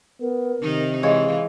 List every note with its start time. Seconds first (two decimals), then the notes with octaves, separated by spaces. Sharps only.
0.21 B3 A#4
0.61 C3 D#3 D#4
1.03 E3 G#3 C#5 F5